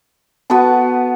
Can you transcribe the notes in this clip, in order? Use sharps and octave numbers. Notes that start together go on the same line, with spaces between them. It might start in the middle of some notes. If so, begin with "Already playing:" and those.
B3 F#4 B4 A5